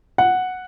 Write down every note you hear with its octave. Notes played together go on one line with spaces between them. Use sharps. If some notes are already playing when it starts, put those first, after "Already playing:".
F#5